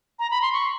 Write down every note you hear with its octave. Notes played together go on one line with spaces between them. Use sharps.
A#5
B5
C6
C#6